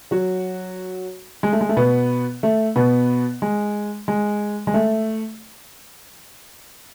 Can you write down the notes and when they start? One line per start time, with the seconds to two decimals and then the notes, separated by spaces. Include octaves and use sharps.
0.11 F#3 F#4
1.43 G#3
1.53 A3
1.61 G#3
1.69 A3
1.77 B2 B3
2.43 A3
2.76 B2 B3
3.42 G#3
4.08 G#3
4.67 G#3
4.74 A3